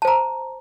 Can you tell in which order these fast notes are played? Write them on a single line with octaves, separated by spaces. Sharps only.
A5 C5 A#5